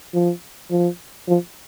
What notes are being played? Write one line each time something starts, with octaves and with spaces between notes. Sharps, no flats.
F3
F3
F3